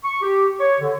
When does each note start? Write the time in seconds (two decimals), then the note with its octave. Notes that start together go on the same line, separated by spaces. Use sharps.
0.04 C#6
0.22 G4
0.60 C#5
0.81 D3